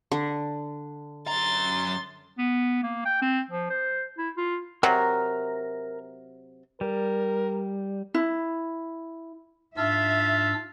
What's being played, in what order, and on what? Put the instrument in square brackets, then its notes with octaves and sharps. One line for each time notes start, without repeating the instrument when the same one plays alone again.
[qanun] D3
[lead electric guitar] F#2 A#5 [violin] C6 A6
[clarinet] B3
A#3
G5
C4
F3
C5
E4
F4
[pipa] C3 F#3 [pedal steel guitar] A#4 A#5
[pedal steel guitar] G3 [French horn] A#4
[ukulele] E4
[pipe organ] G#2 D4 E6 [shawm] F4 [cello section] E5